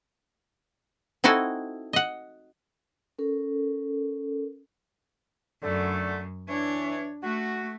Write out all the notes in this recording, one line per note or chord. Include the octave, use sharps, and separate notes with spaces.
C4 D#4 E4 F#4 A4 G#5
D#5 F#5
C#4 A4 A#4
F#2 D3 A3
E3 D4 C#5
A3 F#4